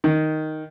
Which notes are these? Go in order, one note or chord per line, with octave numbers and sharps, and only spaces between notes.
D#3